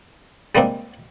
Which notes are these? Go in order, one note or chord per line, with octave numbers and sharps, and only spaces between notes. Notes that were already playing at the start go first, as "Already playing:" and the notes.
G3 G#3 A#3 C4 D4